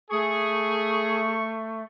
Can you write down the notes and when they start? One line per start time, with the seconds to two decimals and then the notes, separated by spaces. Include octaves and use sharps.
0.11 A3 G#4 C#6